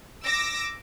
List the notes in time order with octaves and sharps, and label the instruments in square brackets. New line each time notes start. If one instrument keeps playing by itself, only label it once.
[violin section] D6 E6 A#6